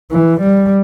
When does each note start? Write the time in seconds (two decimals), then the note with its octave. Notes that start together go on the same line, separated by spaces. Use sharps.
0.12 E3
0.40 G3